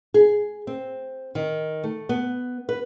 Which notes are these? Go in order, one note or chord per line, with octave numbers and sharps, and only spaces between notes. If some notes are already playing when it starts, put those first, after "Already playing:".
G#4
C4
D#3
A3
B3
B4